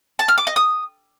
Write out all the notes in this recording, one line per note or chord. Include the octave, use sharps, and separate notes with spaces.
A5
F6
D6
D#5
D#6